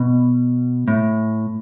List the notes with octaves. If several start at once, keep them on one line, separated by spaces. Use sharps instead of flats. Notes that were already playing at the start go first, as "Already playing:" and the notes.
Already playing: B2
A2